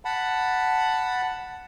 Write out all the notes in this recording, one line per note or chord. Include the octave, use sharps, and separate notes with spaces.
F#5 A5 B5